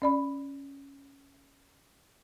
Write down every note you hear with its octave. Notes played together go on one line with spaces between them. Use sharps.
C#4 D5 B5